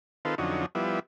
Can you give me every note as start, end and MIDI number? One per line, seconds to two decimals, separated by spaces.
0.25 0.35 51
0.25 0.35 60
0.25 0.35 65
0.25 0.35 69
0.25 0.35 71
0.38 0.66 41
0.38 0.66 50
0.38 0.66 54
0.38 0.66 61
0.38 0.66 63
0.75 1.00 53
0.75 1.00 55
0.75 1.00 59
0.75 1.00 64